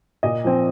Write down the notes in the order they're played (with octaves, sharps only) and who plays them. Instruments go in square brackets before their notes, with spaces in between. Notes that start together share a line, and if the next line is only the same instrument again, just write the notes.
[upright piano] A#2 D#5
F3 C4